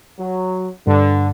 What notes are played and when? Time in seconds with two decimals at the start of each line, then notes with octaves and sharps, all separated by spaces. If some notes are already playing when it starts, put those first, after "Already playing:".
0.19 F#3
0.87 G2 D3